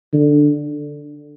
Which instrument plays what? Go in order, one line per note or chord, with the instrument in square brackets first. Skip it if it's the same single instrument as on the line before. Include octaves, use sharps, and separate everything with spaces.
[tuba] D3